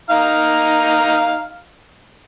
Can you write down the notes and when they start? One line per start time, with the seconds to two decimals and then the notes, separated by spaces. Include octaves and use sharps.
0.10 D#4 F5 A#5